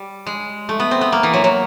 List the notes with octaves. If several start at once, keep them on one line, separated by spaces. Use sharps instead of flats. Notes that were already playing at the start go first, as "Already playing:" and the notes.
Already playing: G3
G#3
A3
B3
C4
B3
A#3
E3
F#3
F#3